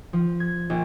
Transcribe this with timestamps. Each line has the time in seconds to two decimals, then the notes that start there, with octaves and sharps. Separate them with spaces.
0.13 F3
0.40 G#6
0.70 A#1